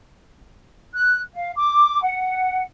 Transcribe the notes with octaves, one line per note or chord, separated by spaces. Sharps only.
F#6
F5
D6
F#5